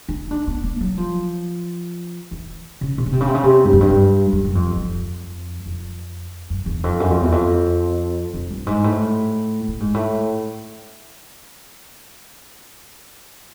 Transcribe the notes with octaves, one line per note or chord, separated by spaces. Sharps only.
D#4
D4
B3
A#3
F#3
F3
E3
C#3
C3
C#3
C3
C#3
C3
C#3
C3
G2
F#2
G2
F#2
F#2
F2
F2
F2
F#2
E2
F2
F#2
F2
E2
F2
F2
G2
G#2
A2
A2
G#2
A2